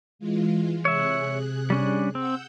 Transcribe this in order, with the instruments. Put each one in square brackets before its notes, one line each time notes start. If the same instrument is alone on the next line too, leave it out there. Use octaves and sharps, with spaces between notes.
[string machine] E3 G#3 F4
[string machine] C3 G#4 F#6 [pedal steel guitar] C#5 E5
[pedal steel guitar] G3 C#4 D4
[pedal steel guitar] C4 [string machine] F#5 E6 G6